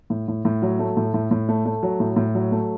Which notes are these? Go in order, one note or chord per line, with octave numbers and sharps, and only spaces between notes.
A2
A2
A2
F#3
A3
A2
A2
A2
A3
A3
F#3
A2
A2
F#3
A3